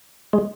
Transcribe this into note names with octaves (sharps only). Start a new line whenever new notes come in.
G#3